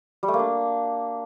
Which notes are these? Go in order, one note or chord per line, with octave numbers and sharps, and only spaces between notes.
G3
A3
A#3
D4